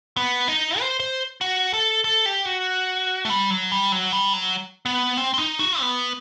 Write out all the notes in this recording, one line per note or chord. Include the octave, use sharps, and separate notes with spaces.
B3
D#4
C5
C5
F#4
A4
A4
G4
F#4
A3
G3
F#3
G3
F#3
G3
F#3
B3
C4
C4
D#4
F#4
B3